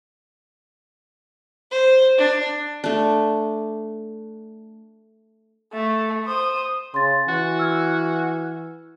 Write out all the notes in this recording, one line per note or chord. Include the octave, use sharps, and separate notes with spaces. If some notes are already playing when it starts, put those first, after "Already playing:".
C5
D4
A3 D4
A3
C5 D#6
C#3 C6 A6
E3 F#4
E6 F6 G#6